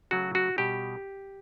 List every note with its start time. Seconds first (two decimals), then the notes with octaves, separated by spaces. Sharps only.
0.11 C#3 F#3 A3 F#4
0.35 F#4
0.58 B2 G3 G4